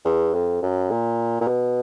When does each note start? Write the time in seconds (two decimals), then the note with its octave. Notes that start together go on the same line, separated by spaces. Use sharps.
0.05 E2
0.34 F2
0.62 F#2
0.90 A#2
1.41 A#2
1.47 B2